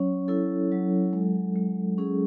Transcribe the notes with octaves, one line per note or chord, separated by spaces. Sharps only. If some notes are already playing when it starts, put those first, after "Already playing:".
Already playing: F#3 C#4 C#5
E4 A4
F#3
G#3
G#3
C#4 G#4